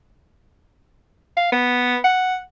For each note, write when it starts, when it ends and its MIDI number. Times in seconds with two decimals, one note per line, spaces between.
1.37 1.50 77
1.52 1.97 59
2.04 2.37 78